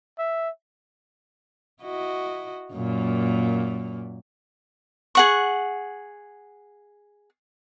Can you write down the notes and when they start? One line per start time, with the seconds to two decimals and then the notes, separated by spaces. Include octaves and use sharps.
0.19 E5
1.83 E4 F#4 D#5
2.73 F#2 A#2 A#3
5.15 G#4 F#5 C#6